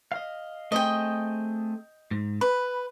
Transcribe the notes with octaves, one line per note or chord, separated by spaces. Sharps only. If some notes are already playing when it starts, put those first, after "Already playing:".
D#5 F5
A3 C4 G#4 D#5 G5
G#2
B4 B5